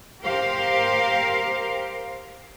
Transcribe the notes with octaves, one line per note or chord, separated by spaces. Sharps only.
G4 A#4 C5 F5